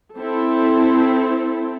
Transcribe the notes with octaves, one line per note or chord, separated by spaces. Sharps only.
C4 E4 A4